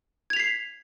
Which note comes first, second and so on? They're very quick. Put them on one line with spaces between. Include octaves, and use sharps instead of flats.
G#6 F7 B6 C7